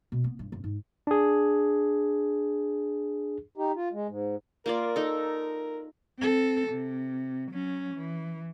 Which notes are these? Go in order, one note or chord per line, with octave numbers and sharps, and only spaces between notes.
B2
B3
G2
F#2
G#2
D4 G#4
D#4 G4
F4
G#3
G#2
A#3 F4 A#4 D5
D#4 A4
C4 A4
C3
F#3 C#4
E3